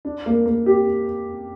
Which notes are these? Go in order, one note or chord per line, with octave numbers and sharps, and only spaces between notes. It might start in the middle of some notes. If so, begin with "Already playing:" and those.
D4
A#3
A#3
G4